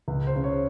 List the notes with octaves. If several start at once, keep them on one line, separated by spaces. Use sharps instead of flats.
C#2
C5
C#3
C#5